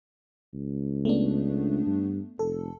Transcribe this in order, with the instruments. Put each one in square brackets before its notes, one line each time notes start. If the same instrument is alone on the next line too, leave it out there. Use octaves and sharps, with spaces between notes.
[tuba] C#2
[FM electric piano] A3 B3 D4
[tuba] G2
[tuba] F1 [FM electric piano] A4